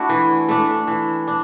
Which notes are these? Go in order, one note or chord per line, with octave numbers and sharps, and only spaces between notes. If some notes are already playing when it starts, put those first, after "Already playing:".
Already playing: A3 D4 E4 F#4
E3
A3 D4
E3
D4